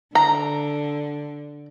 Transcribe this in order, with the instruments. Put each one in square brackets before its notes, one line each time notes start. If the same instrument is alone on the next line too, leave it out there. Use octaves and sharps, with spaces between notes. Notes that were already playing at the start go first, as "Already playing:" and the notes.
[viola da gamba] D3 [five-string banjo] A#5